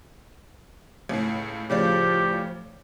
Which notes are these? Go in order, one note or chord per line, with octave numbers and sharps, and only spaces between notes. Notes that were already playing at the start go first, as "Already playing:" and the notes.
C#2 A2
A2 C#3 F3 G4 D5